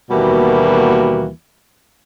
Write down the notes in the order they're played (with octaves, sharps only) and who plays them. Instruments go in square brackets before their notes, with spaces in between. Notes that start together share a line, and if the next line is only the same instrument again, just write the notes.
[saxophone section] D#2 B2 E3 G3 A#3 F#4